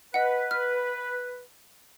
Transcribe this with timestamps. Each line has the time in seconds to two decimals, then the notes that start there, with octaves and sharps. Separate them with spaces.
0.14 B4 D#5 F#5
0.51 F6